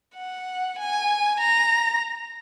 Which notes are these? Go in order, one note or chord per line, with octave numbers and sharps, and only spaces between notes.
F#5
G#5
A#5